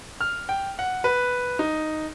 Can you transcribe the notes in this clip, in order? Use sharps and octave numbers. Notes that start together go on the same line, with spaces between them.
F6
G5
F#5
B4
D#4